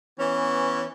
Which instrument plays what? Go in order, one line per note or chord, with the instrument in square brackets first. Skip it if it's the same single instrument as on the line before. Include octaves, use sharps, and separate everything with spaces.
[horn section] E3 B3 C#4